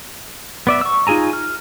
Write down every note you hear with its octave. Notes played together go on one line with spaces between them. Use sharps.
B3 D5 E5
C#6 E6
D#4 F4 G#4 G#5 A#5
F6